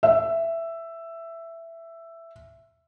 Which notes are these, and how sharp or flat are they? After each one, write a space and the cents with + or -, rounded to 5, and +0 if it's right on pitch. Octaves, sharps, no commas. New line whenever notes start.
E5 +10